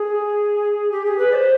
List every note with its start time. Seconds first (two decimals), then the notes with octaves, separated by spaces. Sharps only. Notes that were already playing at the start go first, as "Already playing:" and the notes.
Already playing: G#4
0.91 G4
1.05 G#4
1.18 B4
1.31 D5
1.34 C5